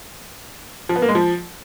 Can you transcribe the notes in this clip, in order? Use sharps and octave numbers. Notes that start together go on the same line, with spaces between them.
F3
B3
A#3
G#3
F3